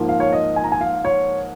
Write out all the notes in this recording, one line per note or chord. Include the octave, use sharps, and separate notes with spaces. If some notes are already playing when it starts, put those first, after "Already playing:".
Already playing: G#2 F3 A#3
F5
C#5
D#5
G#5
A#5
G#5
F5
C#5